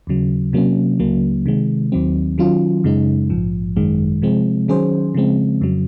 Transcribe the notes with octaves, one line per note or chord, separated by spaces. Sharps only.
D#2 C#3 F#3
C3 F#3 A#3 C#4
C#2 C#3 F#3 A#3
C3 D#3 G#3
D#2 D#3 F#3 C4
D#3 F#3 C#4 F4
F#2 C#3 G#3 D#4
A#1 G#2 F3
G#1 F#2 D#3 G#3
C3 F3 G#3 C4
D#3 F#3 C#4 G#4 C5
C#3 F3 G#3 C4
F2 C#3 F#3